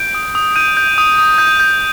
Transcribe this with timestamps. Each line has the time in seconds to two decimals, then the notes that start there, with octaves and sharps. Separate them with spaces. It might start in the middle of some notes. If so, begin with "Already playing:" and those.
Already playing: G6 D7
0.15 D#6
0.35 D#6
0.56 G6 D#7
0.77 G6
0.98 D#6
1.19 D#6
1.38 G6
1.60 G6